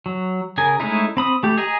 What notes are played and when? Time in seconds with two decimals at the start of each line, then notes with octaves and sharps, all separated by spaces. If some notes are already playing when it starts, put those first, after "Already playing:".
0.06 F#3
0.58 C#3 G#4 A#4 G#5
0.80 G#3 A3 C#4 D#4 E4
1.17 C4 B5 D#6
1.43 A3 G4
1.58 G#4 D#5 G#5 A#5